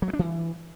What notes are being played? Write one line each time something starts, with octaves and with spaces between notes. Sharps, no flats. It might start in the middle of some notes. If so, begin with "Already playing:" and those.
F#3
G#3
D4
E3